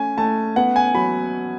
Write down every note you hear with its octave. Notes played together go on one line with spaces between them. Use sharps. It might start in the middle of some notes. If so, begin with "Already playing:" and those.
Already playing: A3 C#4 G#5
A3 A5
B3 F#5
G#5
F#3 B5